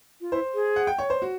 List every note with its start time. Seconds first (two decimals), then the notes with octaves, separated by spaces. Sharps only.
0.21 F4
0.32 E4 C5
0.54 G#4
0.76 F#5
0.87 G5
0.98 C#5
1.10 C5
1.22 F#4